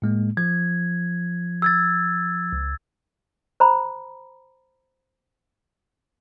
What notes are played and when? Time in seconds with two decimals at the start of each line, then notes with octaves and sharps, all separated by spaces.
0.02 A2 G#3 A#3
0.37 F3 G#6
1.62 E6 G#6 A6
2.52 C#2
3.60 C5 A#5 B5